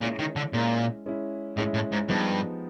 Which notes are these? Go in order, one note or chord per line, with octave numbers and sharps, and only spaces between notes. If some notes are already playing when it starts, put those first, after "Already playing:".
A#2 G#3 C#4 E4
D#3
D3
A#2 G#3 C#4 E4
G#3 C#4 E4
A2 G#3 C#4 E4
A2
G#2
G2 F3 G#3 B3 D#4 G4